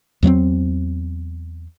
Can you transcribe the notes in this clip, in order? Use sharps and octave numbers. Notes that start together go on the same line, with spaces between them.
E2 F#3 G#3 C4